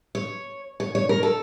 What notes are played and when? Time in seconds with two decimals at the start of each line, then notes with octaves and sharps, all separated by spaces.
0.15 C#5
0.80 C#5
0.95 C#5
1.09 A#4
1.23 A4